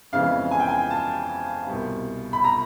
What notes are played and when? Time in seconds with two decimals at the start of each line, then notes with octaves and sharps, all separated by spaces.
0.12 F2 C#3 E3 G#3 B3 F5
0.51 G#5
0.60 G5
0.69 G#5
0.90 A5
1.67 C2 B2 G3
2.33 B5
2.44 A#5